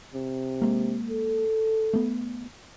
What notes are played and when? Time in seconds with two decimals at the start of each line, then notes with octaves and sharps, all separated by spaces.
0.14 C3
0.62 G#3 A#3
1.10 A4
1.93 A3 B3